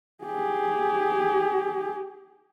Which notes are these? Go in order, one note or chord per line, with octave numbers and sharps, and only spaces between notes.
G4 G#4